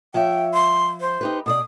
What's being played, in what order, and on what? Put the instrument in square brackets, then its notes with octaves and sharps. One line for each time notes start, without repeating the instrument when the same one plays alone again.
[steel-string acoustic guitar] F3 C#5 E5 [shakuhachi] G5
[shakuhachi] C6
C5
[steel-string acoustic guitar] D#4 G4 B4
[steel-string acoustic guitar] B2 C5 D5 [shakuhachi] D#6